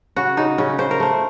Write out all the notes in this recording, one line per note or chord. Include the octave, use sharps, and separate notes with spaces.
C#3 F#4
C#3 D#4
C#3 C#4
C#3 C5
A#4
A3 C5